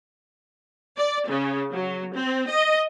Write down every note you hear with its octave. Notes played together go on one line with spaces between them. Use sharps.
D5
C#3
F#3
C4
D#5